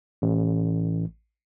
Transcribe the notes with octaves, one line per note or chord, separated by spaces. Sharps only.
A1